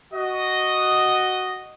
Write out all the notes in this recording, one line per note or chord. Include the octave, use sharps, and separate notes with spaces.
F#4 D#5